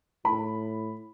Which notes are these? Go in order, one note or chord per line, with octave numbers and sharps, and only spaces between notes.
A2 B5